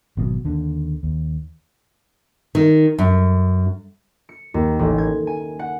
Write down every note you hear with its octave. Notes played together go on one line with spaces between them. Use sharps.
G#1 B2 F#3
D#2 D3
D#2
D#3
F#2
C#7
D#2
A1
G#6
G#5
F#5